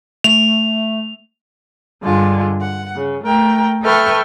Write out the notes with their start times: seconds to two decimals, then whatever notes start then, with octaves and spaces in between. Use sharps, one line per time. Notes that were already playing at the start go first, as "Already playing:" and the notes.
0.24 A3 F7
2.03 G2 D3 G#3 F4
2.62 F#5
2.97 C#3
3.25 A3 A#4 G5
3.83 A4 B4 E5 G5 C#6 F6